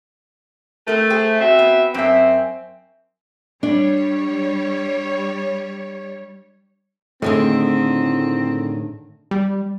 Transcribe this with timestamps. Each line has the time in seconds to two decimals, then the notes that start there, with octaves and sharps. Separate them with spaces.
0.88 A3 C4 A#4
1.10 G#4 C5 G5
1.41 C4 F#4 E5
1.59 B3
1.94 F#2 C4 E5
3.63 G3 D4 C#5
7.22 A2 D3 D#3 G#3 C4
9.31 G3